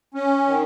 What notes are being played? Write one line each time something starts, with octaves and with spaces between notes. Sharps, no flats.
C#4
D#3